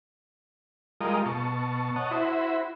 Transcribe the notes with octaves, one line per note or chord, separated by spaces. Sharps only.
G3 G#3 F4 A#4 D#5
B2 A5 C#6
C#5 D#5 F#5 A5
E4 F#4 C5 B5